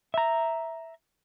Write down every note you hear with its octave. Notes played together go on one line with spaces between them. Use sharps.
E5 A#5